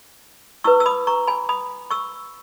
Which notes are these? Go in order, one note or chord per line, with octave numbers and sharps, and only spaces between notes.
E4 B4 C#6 E6
E6
B5 D#6
A#5 C#6
G#5 B5
B5 D#6
C#6 E6